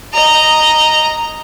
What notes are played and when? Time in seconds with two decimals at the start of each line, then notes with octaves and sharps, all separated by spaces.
0.13 D#5 A#5